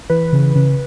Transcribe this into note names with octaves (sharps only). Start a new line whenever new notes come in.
E3 B4
C#3
C#3